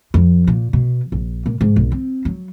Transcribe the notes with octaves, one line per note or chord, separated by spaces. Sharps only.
F2
A#2
B2
A#1
A#2
G#2
B1
C4
F#3